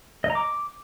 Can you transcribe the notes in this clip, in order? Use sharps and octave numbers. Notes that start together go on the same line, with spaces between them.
D#5
A#5
D6